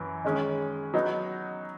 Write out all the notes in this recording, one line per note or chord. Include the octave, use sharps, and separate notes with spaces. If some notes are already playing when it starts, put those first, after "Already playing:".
Already playing: F#2 E3
D#3 G#3 C#4 G#4
F#3 B3 D#4